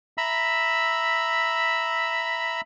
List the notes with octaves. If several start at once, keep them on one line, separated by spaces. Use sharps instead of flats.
E5 A#5 B5 E6